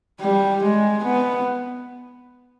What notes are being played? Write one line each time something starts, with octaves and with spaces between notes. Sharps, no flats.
G3
G#3
B3